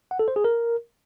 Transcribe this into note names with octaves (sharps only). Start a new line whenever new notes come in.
F#5
A4
C5
G#4
A#4